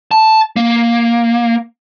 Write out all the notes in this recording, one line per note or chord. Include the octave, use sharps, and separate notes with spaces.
A5
A#3